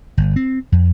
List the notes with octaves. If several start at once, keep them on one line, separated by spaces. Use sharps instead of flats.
G1
C4
F2